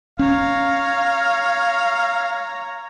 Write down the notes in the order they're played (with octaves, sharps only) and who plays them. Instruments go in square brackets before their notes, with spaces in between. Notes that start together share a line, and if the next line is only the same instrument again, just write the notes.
[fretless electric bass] C#4 [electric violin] C#5 A#5 [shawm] F5